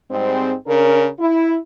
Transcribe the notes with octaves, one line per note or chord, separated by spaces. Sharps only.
G#2 G3 G#3 C4
C#3 C#4 D4 A#4
E4